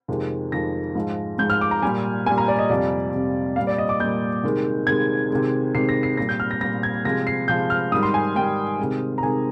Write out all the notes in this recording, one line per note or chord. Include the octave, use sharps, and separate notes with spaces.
F2 C3 D#3 G#3
F2 C3 D#3 G#3 A#6
G#2 F3 G#3
G#2 F3 G#3 G6
F6
D6
A#5
A#2 G3 G#5
A#2 G3 G#5
A#5
D5
D#5
F2 C3 G3 D5
F2 C3 G3
A#2 G3 F5
D5
D#5
D6
A#2 G3 G6
C3 D#3 G#3
C3 D#3 G#3 G#6
C3 D#3 G#3
C3 D#3 G#3 C7
A#6
C7
A#2 G3 A#6
G6
F6
A#6
A#2 G3 A#6
G#6
C3 F3 G#3 A#6
C7
C3 F3 G#3 G6
F6
G#2 D#3 G3 D#6
C6
G#5
G#2 D#3 G3 G5
C3 D#3 G#3
A#5
C3 D#3 G#3 G#5